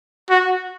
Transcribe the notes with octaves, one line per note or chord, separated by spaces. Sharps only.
F#4